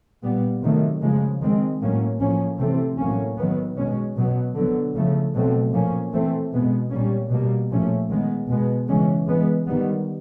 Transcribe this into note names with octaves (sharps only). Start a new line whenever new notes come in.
A#2 G3 B3
C3 D#3 F#3 A3
C#3 F3 G#3
D#3 G#3 C4
A2 F#3 A#3 C#4
A2 F3 A#3 C#4
C3 E3 A3 C4
A2 F#3 A#3 C#4
D#3 F#3 B3
B2 G#3 C#4
B2 F#3 B3
D3 F#3 B3
C#3 F3 A3
B2 F#3 A3 C4
A#2 F3 A#3 C#4
E3 A3 C4
B2 G#3 B3
A#2 G3 A#3 C#4
B2 G3 A#3
A#2 F3 A3 C#4
D#3 G#3 B3
B2 G#3 B3
C#3 E3 G#3 C#4
E3 G#3 B3
D#3 G3 B3